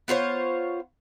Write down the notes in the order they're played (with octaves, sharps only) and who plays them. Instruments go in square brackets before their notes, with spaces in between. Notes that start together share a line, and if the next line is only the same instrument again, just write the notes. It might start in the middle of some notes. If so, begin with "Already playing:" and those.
[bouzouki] B3 F4 C5 C#5